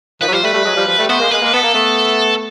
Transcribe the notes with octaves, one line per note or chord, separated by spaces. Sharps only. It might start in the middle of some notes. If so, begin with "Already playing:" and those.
D#3 F3 B4
F#3
F3 G3 C5
G3 A3 B4
G3 A3
F#3 G#3
F3 G3
F3 G3
G3 A3
A3 B3 C5
G#3 A#3
G#3 A#3 B4
G#3 A#3
B3 A4
A#3
A3 B3